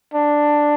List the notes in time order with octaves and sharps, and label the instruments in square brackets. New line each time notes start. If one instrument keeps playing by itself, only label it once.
[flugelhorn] D4